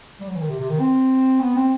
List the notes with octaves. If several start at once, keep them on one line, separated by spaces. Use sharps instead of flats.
G3
F#3
E3
D#3
C3
C3
D#3
C4
B3
C4